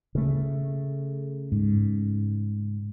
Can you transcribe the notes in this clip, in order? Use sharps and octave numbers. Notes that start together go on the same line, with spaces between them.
C#3 A3
G#2